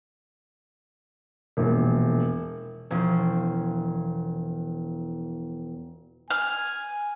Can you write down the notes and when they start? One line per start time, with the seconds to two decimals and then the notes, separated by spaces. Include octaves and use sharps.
1.57 E1 A#1
2.91 E1 F3 C#4 C5
6.31 G#5 F6